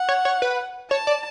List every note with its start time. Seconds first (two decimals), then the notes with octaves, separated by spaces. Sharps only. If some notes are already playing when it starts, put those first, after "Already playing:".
Already playing: F#5
0.09 C#5
0.25 C#5
0.42 B4
0.91 C#5 A5
1.07 D5